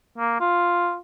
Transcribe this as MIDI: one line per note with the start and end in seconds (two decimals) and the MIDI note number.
0.18 0.38 58
0.40 0.97 65